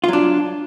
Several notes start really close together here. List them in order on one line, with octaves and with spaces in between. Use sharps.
F4 F#3 D4